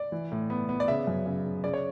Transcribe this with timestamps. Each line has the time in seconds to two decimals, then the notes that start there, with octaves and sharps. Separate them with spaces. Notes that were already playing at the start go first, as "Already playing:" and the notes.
Already playing: D5
0.12 E3
0.32 A2
0.50 B3
0.69 B3
0.80 D5
0.88 C#3 E5
1.07 F#2
1.26 C#3
1.44 C#3
1.64 C#3 D5
1.73 C#5